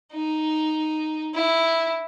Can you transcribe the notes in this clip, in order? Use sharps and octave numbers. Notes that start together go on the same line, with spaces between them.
D#4
E4